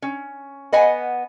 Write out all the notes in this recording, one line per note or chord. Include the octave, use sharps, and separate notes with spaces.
C#4
B3 D#5 F#5 G#5